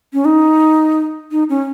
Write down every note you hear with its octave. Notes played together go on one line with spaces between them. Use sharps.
C#4
D#4
D#4
C#4